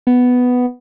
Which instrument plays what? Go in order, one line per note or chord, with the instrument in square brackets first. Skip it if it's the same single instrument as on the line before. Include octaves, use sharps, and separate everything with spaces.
[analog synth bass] B3